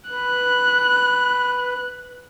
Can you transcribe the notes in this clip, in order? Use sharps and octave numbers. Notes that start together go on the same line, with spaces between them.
B4 F#6